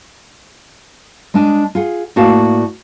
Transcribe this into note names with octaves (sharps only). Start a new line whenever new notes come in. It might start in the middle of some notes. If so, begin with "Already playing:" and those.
G#3 D4 D#5
F4 G#4 F#5
A2 A#3 F#4 D5 F5 A5